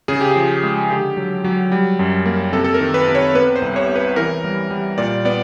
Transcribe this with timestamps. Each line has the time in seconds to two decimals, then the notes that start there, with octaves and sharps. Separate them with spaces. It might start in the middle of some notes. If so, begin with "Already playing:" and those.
0.08 C#3 G#4
0.21 G4
0.31 F3 G#4
0.63 G#3
0.90 D3 G4
1.17 F#3
1.44 F#3
1.72 G3
1.99 F#2
2.25 A#3
2.53 C3 A4
2.64 A4
2.74 A#4
2.80 D#3
2.94 B4
3.08 C3
3.15 C#5
3.35 B3 B4
3.56 C5
3.62 C2
3.76 C#5
3.89 B3
3.95 B4
4.16 E3 A#4
4.44 G3
4.70 G3
4.98 A#2 D5
5.25 B3 D5